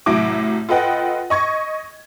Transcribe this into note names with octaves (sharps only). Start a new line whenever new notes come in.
C2 A2 F#3 E4 D6
F4 A4 B4 D#5 F#5 G5
D#5 C#6 G#6